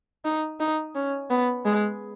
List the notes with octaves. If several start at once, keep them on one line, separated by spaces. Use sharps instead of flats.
D#4
D#4
C#4
B3
G#3